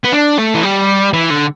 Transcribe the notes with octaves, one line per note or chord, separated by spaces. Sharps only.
B3
D4
A3
E3
G3
E3
D3